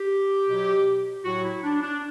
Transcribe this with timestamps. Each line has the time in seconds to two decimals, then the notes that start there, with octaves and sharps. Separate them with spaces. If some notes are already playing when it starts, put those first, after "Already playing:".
Already playing: G4
0.47 B2 F#3
1.24 A2 F#3 F#4
1.43 E4
1.63 D4
1.81 D4